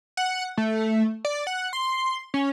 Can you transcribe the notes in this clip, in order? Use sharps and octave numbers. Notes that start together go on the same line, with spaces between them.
F#5
A3
D5
F#5
C6
C#4